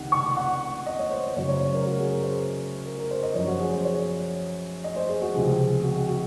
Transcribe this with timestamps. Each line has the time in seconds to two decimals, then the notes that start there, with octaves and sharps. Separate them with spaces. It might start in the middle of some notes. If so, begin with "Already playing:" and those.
Already playing: C#2 C3 D#3 F#5
0.12 C#6
0.37 F#5
0.86 D#5
0.99 C#5
1.11 C5
1.36 F#2 C#3 F#3 C#5
1.49 C#5
1.61 C5
1.74 A#4
1.86 F#4
1.99 G#4
2.11 A#4
2.23 C5
2.85 A#4
2.98 A#4
3.11 C5
3.23 D#5
3.35 F#2 F3 C#5
3.47 F#4
3.59 G#4
3.73 C5
3.85 C#5
4.84 D#5
4.96 C5
5.09 G#4
5.21 F#4
5.34 C#2 C3 F3 G#4
5.83 F#4
5.96 G#4
6.08 F#4